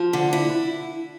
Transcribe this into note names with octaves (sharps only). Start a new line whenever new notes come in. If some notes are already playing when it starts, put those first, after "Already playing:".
Already playing: F3
D3
E4